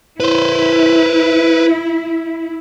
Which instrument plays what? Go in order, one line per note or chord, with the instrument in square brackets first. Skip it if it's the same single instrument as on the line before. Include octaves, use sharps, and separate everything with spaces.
[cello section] E4 [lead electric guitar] B4 C5